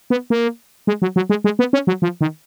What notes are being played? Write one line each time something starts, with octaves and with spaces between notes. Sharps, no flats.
B3
A#3
G#3
F#3
F#3
G#3
G#3
B3
C#4
F#3
F3
D#3